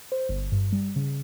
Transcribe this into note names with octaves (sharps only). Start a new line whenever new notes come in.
C5
G1
G2
G3
C#3